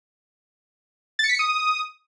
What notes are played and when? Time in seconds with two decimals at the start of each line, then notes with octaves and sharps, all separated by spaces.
1.19 A6
1.24 C#7
1.29 B6
1.34 C#7
1.39 D#6